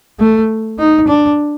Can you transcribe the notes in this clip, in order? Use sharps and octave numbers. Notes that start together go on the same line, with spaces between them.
A3
D#4
D4